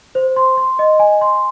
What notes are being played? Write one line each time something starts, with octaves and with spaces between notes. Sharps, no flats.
C5
C6
C6
D#5
G#5
C6